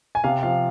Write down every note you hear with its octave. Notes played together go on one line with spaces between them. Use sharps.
G#5
C3 F5
F3 F5